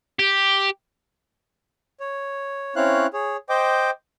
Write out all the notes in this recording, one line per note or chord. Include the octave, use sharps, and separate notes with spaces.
G4
C#5
C4 C#4 E4 C#5 F5 F#6
G#4 C#5
C5 D#5 G5 D6